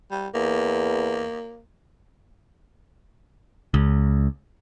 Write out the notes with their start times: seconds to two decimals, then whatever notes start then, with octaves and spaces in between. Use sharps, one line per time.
0.11 G3
0.34 E2 A#3
3.74 C#2